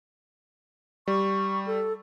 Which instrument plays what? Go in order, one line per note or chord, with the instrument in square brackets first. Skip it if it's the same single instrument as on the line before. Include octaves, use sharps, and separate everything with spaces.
[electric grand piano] G3 [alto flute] C#6
[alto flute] A4